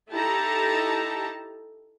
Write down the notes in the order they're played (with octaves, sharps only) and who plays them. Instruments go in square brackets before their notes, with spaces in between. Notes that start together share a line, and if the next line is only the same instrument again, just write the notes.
[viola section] D#4 E4 G4 A4 A5 A#5